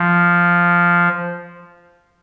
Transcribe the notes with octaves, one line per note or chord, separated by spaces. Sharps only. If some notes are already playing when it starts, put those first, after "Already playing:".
Already playing: F3